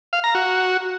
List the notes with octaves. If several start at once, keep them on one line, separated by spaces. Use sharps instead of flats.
F5
A#5
F#4